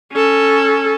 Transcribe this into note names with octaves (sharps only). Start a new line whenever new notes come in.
C#4 A4